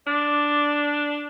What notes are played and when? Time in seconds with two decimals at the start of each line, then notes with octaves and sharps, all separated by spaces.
0.07 D4 D5